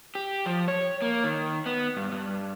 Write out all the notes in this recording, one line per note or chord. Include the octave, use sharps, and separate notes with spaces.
G4
F3
C#5
A#3
D#3
B3
G2
G2